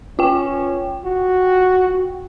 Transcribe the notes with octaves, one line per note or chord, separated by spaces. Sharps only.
C#4 F4 G5
F#4